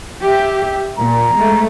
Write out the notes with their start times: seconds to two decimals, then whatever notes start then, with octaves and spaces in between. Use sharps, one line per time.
0.23 G4 E5
0.99 A#2 A#5
1.36 G#3 A3